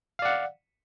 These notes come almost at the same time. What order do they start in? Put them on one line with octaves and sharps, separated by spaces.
F5 D5 F#5